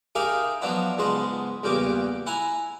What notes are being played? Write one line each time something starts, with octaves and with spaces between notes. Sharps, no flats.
D#4 G4 G#4 A#4 E5 F5
F3 F#3 B3 D4 E4
C#2 G#2 G#3 B3 A5 C6
E2 G2 A#2 C#3 G4 D6
E4 F#5 G#5 A#5